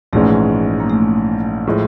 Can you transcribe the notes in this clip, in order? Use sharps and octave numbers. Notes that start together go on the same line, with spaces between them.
A#1 G#2 E3 G#3 A3 C#4
A#3
A3
A2 F3 G#3